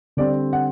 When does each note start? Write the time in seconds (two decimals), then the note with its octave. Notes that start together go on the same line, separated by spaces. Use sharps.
0.17 D3 G3 C4 D5
0.53 F#5